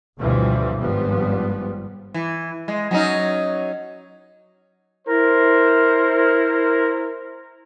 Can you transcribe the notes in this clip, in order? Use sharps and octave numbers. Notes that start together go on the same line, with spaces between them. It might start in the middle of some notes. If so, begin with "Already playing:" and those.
D2 G2 B2 E3 F3 G3
G#1 G2 F3 G3 B3
E3
G#3
F#3 C#4 D#4
E4 A#4 C5